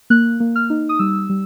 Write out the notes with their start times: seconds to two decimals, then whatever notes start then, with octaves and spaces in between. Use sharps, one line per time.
0.10 A#3 F#6
0.40 A#3
0.56 F6
0.70 D#4
0.89 D#6
0.99 G3 E6
1.29 G3